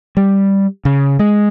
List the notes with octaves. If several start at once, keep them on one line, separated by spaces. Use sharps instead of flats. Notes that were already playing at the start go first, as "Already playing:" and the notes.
G3
C#3
G#3